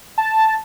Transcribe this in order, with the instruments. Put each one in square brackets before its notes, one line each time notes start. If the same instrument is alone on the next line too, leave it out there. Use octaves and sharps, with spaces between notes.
[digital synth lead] A5